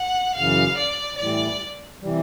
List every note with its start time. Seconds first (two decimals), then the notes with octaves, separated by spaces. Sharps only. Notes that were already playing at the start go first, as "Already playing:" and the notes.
Already playing: F#5
0.35 F#2 C#3 E3 F5
0.77 D5
1.18 A2 E3 G3 D5
2.01 C3 E3 G3